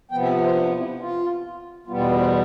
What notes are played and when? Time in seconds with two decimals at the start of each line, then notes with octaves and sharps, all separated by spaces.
0.11 C3 F3 B3 G5
0.23 E5
0.45 C5
0.56 D4
0.77 E4
0.99 F4
1.87 E2 B2 G3 B3 F4
1.98 F4
2.09 B4
2.21 C5